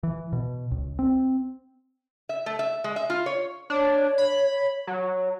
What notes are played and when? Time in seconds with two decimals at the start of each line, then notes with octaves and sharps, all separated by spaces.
0.03 E3
0.33 B2
0.71 C#2
0.99 C4
2.29 E5
2.46 A3
2.59 E5
2.84 G#3
2.96 E5
3.10 F4
3.26 C#5
3.70 D4 C#5
4.18 B5
4.87 F#3